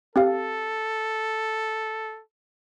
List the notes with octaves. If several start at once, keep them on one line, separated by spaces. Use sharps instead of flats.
C4 G4 A4 F5